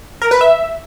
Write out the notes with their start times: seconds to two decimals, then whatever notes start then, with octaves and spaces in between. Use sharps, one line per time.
0.22 A#4
0.31 B4
0.41 E5